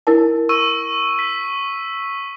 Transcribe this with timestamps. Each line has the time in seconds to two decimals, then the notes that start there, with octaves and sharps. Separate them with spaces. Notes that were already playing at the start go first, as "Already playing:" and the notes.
0.07 E4 A#4 A5
0.49 C#6 E6 D#7
1.19 B6